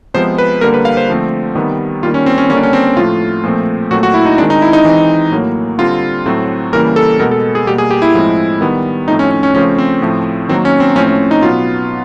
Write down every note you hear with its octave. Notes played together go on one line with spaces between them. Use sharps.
C3 F3 G#3 B3 C5
B4
D3 G3 A#3 A#4
B4
F5
C5
D3 F3 A3 C4
C3 D#3 G3 B3
D#3 G3 A#3 F4
C#4
C4
C#4
D3 G3 A#3 C#4
D4
C#4
C4
A2 F3 A3 F4
A#2 F3 A3 C4
A#2 F#3 A3 C4 F#4
F#4
E4
D#4
D#3 G#3 C4 D4
D#4
E4
D#4
E3 G#3 C4
A2 F#3 A#3
D3 G3 C4 F4
A2 F#3 A3 C4
C#3 E3 G3 A#3 A#4
A4
B2 G#3 B3 A#4
A4
G#4
B2 G3 A#3 G4
G#4
G4
E4
A2 F3 G#3 C4
D#3 G3 B3
A2 F3 A3 C4 D#4
C#4
C#4
C#4
C#3 F3 A3 C4 C#4
C4
A2 F3 A3 C4
D#3 F#3 A#3 C4
C#4
C4
A2 F3 A3 C4 C#4
C#4
D#4
B2 F#3 B3 F4